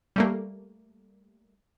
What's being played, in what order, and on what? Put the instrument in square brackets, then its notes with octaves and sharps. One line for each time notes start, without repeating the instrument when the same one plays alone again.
[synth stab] G3 A3 A#3